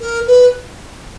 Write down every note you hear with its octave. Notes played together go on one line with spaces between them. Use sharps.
A#4
B4